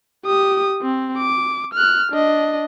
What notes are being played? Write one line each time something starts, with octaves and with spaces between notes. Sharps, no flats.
G4 D#6
C4
D6
F6 F#6
D4 D#5